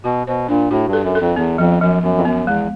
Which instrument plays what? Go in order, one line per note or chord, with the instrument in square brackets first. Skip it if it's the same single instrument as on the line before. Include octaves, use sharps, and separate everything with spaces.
[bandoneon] B2 [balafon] F#4
[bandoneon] B2 [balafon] C5
[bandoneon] A#2 [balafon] D4
[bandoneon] A2 [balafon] F#4
[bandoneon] G2
[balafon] A4
[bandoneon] F#2
[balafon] A4
[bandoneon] F2
[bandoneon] E2 [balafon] B3
[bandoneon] F2 [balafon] F3
[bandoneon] F#2 [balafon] F3
[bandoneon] F#2 [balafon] B3
[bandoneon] F2
[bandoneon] F#2 [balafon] B3
[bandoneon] E2 [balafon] G#3